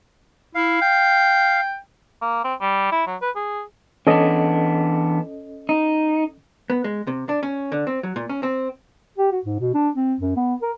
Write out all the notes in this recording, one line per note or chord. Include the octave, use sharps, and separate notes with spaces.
E4 F5
G5
A#3
C4
G3
E4
F#3
B4
G#4
E3 B3 C#4 D4 A4 D#5
D#4
B3
G#3
C3
D4
C#4
D3
C4
F#3
A#2
C#4
C4
G4
F#4
G#2
B2
D4
C4
F#2
B3
A#4